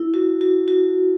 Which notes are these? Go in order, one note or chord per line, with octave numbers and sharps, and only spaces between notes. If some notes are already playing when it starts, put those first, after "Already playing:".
Already playing: E4
F#4
F#4
F#4